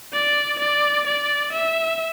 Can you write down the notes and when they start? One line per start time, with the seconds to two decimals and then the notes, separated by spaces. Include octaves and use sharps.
0.13 D5
0.59 D5
1.06 D5
1.52 E5